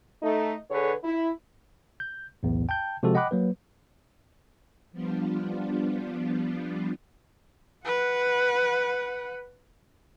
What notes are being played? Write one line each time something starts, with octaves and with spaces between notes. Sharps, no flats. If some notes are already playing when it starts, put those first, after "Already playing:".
A3 D#4
D3 G#4 A4 B4 C#5
E4
G6
B1 E2 A2
G5 A5 G6
C3 F3 G#3 F#4 A4
D#5 F#5 G5 B5 D6 F#6
F#3 A#3 B4
F3 G3 B3 D4 F4
B4 F#5